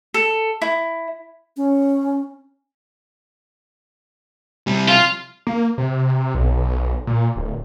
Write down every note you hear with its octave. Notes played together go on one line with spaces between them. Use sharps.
A4
E4
C#4
C3 G3
F4
A#3
C3
B1
A#2
D1